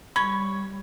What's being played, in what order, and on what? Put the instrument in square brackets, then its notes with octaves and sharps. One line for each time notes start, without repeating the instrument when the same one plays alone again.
[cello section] G3 [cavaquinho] C#5 [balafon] B5 [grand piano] G#6